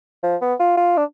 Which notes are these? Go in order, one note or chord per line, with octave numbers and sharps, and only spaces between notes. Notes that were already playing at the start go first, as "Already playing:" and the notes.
F3
B3
F4
F4
D4